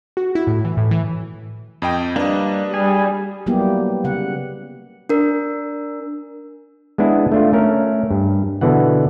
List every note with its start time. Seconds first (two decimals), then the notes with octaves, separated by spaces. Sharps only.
0.17 F#4
0.35 E4
0.47 A2
0.65 E3
0.77 A2
0.91 E3
1.82 F2 D#5 G5
2.16 G3 A#3 D4 B4 D#5
2.74 G3 G#4
3.46 F#3 G3 A#3 B3 E4 G4
4.04 C#3 F#5
5.09 D4 A#4
6.98 G#3 B3 D4 E4 G#4
7.32 A3 D4 F4
7.53 A3 C#4 A#4
8.11 G2
8.61 B2 D3 E3 F#5